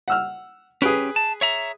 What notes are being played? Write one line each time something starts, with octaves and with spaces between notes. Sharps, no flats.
F#5 E6 F6
C#4 G4 G#4 B4
A5
C#5 E5 A#5